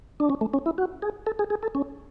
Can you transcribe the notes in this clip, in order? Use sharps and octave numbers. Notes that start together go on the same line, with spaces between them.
D4
C#4
A3
C#4
E4
F#4
G#4
A4
G#4
G#4
A4
C#4